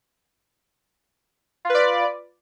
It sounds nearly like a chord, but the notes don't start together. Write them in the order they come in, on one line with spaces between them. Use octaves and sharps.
F4 B4 D5